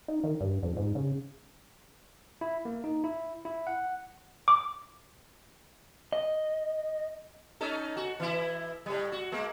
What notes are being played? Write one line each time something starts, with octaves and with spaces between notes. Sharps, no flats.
D#4
D#3
G2
F2
G#2
C#3
E4
A#3
D#4
E4
E4
F#5
D6
D#5
C#4 D#4 A4
F#4
E3 E4
A2 G3
F#4
G#3 A#3